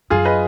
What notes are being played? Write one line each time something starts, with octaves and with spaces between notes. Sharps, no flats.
F#2 F4 G#4
B4 D#5